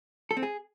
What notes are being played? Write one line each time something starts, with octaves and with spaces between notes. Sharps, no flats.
A4
C4
G#4